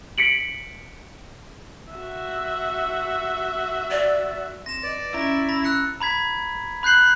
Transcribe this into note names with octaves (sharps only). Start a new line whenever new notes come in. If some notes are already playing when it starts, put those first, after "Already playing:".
B6 C#7 D7 F#7
F#4 E5
D5
C4 A#6 E7
B4 D5 D#5
C#4 E4 A#5 A#6
B5 A6 A#6
E6 F#6 C#7
A#5 B5 G#6 B6
B5 F#6 G6 C7 F#7